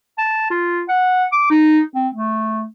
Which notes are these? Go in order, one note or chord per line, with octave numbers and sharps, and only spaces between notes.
A5
F4
F#5
D6
D#4
C4
A3